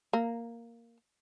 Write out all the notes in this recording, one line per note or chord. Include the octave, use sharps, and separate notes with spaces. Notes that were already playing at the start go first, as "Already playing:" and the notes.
A#3